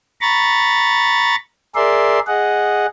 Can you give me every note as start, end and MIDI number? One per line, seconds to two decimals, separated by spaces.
0.21 1.35 82
0.21 1.35 83
0.21 1.35 85
0.21 1.35 93
1.75 2.19 68
1.75 2.19 70
1.75 2.19 74
1.75 2.19 76
1.75 2.19 84
2.27 2.86 68
2.27 2.86 75
2.27 2.86 78